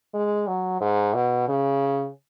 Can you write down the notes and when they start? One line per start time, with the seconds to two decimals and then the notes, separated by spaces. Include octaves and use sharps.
0.14 G#3
0.47 F#3
0.81 G#2
1.14 B2
1.48 C#3